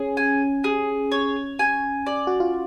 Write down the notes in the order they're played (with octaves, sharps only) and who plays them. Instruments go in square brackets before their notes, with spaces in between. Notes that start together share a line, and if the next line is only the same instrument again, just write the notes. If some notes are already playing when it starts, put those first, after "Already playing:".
Already playing: [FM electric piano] C#4 [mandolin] G#4
[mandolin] G#5
G#4
C#5
G#5
D5
[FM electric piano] F#4
F4